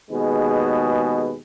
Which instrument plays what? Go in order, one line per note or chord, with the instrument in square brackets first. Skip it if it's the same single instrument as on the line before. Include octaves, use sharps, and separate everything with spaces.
[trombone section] D#2 B2 G#3 G#4 B4